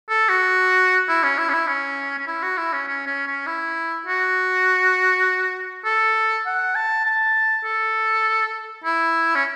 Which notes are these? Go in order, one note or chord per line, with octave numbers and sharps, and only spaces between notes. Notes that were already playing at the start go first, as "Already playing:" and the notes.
A4
F#4
E4
C#4
E4
C#4
E4
C#4
C#4
E4
F#4
E4
C#4
C#4
C#4
C#4
E4
F#4
A4
F#5
A5
A5
A4
E4
C#4